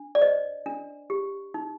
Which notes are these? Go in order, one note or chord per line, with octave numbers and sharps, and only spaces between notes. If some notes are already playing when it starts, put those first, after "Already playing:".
Already playing: D4
D5
C5 D#5
D4
G4
D#4